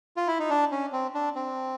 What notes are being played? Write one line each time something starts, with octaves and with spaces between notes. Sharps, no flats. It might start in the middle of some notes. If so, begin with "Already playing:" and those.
F4
E4
D#4
D4
C#4
C4
D4
C4